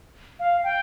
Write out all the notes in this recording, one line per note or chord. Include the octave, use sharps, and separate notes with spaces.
F5
G5